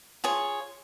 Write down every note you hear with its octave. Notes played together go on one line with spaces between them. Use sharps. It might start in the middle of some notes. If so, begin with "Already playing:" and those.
F4 G#4 C#5